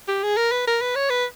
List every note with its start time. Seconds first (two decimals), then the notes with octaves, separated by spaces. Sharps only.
0.08 G4
0.23 G#4
0.37 A#4
0.52 B4
0.67 A#4
0.82 B4
0.96 C#5
1.10 B4